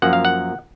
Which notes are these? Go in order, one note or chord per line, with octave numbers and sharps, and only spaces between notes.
F#2 F3 A#3 F#5
F5
F#5